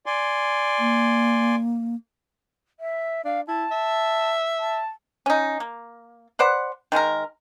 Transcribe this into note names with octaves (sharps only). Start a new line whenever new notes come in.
D5 G#5 C6
A#3
E5
D4 F5
E4 A5
E5
A5
C#4 D#4
A#3
B4 C5 D5 F#5
D#3 G#3 F4 A#4